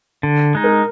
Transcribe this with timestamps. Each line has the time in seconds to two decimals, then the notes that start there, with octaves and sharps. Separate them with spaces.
0.23 D3
0.55 G#3 D#4
0.64 A#4